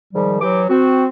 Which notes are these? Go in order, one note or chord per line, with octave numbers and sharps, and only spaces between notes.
G#2 D#3 F3 G3
E3 F#3 G4 D6
C4 F#4